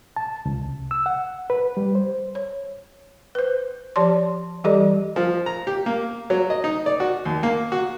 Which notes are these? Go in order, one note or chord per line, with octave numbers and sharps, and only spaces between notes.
A5
C#2
C2
E6
F#5
B4
G3
C5
C#5
B4 C5
F3 G4 C#5 D5 A5 C6
E3 G3 G4 A4 D5 D#5
F3
A#5
G4
A#3
F#3
D#5
D#4
D5
F#4
D#2
A#3
F#4